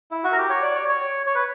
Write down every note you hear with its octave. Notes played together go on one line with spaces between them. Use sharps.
E4
F#4
A#4
G4
C#5
D5
C#5
C#5
C#5
B4